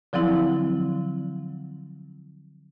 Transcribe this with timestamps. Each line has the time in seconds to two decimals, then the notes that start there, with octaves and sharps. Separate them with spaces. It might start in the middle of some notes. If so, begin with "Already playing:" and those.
0.13 D3 F3 F#3 C4 E4